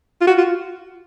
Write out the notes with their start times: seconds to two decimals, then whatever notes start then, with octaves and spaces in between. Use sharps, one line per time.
0.21 F4
0.27 F#4
0.38 F4